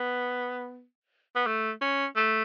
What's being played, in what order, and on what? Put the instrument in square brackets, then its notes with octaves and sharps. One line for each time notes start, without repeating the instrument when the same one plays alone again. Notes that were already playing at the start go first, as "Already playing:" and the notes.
Already playing: [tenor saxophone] B3
B3
A3
C#4
A3